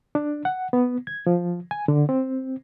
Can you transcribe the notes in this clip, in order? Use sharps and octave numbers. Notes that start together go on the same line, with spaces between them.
D4
F#5
B3
G#6
F3
G#5
D3
C4